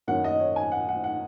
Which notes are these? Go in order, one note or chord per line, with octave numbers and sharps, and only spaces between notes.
F#2 D#3 A#3 C#4 F#5
D#5
C#5
G#5
F#5
F#5
F#5